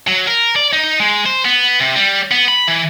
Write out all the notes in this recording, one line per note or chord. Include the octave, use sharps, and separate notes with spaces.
F#3
A#4
D5
D#4
G#3
C5
B3
C3
G3
B3
B5
E3